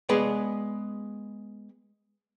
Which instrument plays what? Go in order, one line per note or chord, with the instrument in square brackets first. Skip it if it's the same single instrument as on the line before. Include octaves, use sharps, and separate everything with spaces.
[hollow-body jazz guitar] G#3 B3 G#4 B4 D5